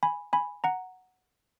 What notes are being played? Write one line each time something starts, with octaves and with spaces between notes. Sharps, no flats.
G#5 B5
G#5 B5
F#5 A#5